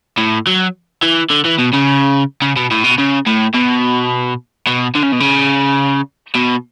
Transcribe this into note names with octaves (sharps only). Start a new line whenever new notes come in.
A2
F#3
E3
D3
E3
B2
C#3
C#3
B2
A2
B2
C#3
A2
B2
B2
D3
C#3
B2
C#3
B2